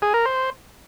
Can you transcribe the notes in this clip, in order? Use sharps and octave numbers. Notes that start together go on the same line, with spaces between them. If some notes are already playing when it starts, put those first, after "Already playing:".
G#4
A#4
C5